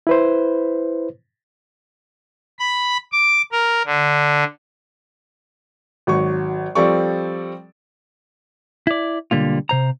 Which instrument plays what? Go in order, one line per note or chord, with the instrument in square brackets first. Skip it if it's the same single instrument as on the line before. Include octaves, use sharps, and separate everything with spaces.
[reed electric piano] E4 B4 C5
[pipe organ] B5
D6
A#4
D3
[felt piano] G#1 F#3 C#6
F3 G3 C4 A4 D5 C#6
[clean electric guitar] E4 D5
B1 D3 G3 A#3 F4
C3 C5 A#5